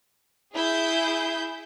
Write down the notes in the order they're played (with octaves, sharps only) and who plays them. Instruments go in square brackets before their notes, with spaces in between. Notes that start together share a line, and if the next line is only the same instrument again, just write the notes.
[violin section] E4 G#4 G6